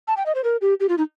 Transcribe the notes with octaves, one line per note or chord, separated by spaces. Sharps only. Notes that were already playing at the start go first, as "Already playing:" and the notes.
A5
G5
D#5
C5
A#4
G4
G4
F4
D#4